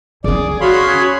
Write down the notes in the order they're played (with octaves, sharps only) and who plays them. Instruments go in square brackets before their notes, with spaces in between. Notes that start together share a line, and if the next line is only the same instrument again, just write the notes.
[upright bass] D#3 C#4 [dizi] G#4 [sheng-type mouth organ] D5
[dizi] F#4 [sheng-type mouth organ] C#5 B5 C6 [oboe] F5
[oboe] G#4